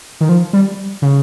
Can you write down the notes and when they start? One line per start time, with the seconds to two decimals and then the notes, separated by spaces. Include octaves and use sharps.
0.21 D#3
0.29 F3
0.53 G3
1.02 C#3